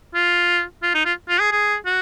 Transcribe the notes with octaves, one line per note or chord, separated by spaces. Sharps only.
F4
F4
D#4
F4
F4
G#4
G#4
F#4